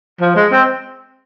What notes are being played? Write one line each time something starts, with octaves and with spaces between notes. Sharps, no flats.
F3
G#3
C4